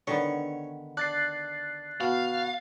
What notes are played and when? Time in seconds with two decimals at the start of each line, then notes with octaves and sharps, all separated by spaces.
0.07 D3 D#3 B3 C#5
0.97 D4 F#6 A6 C7
2.01 B2 F5